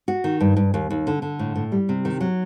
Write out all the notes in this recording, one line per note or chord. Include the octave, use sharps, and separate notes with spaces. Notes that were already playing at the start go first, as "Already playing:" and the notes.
F#4
D#3
G2
G2
D#2
D#2
D3
D3
A2
A2
G3
C3
D#3
F#3